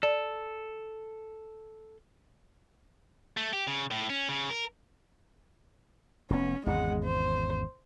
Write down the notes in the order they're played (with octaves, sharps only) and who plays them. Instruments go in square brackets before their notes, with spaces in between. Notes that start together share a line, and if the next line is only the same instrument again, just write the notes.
[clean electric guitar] A4 [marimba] D5
[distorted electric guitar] A3
G4
C#3
A2
C#4
C#3
A#4
[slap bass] F1 B3 [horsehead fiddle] C#4
[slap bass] G#1 E2 C#3 [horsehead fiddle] G#3 F#5
[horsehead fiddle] C5